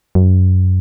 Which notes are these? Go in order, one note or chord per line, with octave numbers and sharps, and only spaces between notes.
F#2